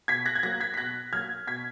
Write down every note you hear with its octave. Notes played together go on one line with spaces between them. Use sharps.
B2 G#6 B6
F#6 A#6
G#6
F#3 A#3 F#6 A#6
G#6 B6
B6
B2 F#6 A#6
F#3 A#3 F6 G#6
B2 G#6 B6